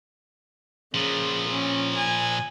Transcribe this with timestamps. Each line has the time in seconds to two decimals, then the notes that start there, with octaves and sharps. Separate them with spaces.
0.94 A#2 C#3 F3
1.49 C#4
1.96 G#5